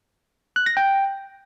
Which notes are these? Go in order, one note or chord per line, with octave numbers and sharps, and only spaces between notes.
F#6
A#6
G5